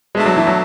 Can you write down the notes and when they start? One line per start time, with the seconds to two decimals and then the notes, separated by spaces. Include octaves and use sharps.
0.15 B2 G#3 A3 D4
0.26 F#3
0.37 E3
0.47 F#3